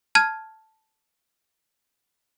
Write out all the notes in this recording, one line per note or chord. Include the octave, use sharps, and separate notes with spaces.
A5 F6 G#6 D#7